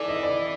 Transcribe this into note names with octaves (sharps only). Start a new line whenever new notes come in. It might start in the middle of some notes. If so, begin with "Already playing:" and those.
Already playing: E3 A4 D5
D#5
D5